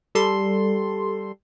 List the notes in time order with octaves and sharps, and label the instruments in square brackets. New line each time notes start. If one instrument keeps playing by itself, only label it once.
[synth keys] G3 A4 C6